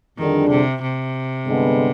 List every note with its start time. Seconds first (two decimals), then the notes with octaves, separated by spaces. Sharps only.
0.18 F2 D3 D#3 G3 D4 G#4
0.50 C3
0.82 C3
1.46 G2 D3 G#3 B3